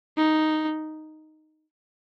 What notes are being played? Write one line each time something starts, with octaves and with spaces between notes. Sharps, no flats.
D#4